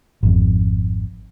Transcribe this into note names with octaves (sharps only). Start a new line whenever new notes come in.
G#1 F2